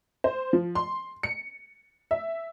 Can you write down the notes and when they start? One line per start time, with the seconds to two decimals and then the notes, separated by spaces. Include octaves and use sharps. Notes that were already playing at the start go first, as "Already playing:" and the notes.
0.24 C5
0.53 F3
0.75 C6
1.23 C#7
2.11 E5